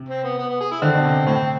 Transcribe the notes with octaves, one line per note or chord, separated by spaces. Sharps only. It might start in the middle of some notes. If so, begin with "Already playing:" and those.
Already playing: C3
C4
B3
B3
B3
G#4
E4
D3 C4
B2
C3
A2 C4